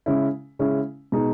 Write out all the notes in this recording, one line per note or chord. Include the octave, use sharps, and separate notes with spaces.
C#3 G#3 C#4 E4
C#3 G#3 C#4 E4
B2 G#3 D#4